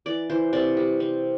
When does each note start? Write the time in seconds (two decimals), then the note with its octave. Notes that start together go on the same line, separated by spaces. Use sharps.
0.06 E3 D5
0.30 E3 C5
0.53 C3 D5
0.77 G3
1.00 C4